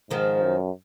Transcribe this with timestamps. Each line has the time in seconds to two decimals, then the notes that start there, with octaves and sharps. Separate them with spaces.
0.11 G#2 D#3 F3
0.43 F#2